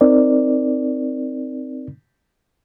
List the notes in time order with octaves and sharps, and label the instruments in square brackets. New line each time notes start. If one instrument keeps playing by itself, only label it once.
[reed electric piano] C4 D#4 A#4 D5